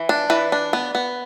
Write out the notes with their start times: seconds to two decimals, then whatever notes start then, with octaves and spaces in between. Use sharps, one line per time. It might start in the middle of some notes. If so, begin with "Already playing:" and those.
Already playing: E3
0.09 D4
0.30 E3 B4
0.52 D4
0.73 B3
0.95 B3